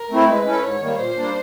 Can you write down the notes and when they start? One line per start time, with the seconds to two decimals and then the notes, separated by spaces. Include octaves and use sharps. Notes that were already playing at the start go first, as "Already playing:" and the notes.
Already playing: A#4
0.11 A3 C4 E4
0.28 G#3 B4
0.46 C#4 E4 A4
0.63 G#2 C#5
0.80 D#3 G3 A#3
0.98 A#2 C5
1.17 G3 A#3 D4